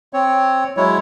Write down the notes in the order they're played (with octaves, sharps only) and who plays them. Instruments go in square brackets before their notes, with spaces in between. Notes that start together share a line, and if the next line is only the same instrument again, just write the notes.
[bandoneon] C4 C#5
F#3 G#3 E4 C#5